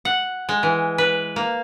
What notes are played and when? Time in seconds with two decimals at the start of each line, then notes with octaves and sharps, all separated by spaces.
0.05 F#5
0.49 G#3
0.63 E3
0.98 B4
1.36 A#3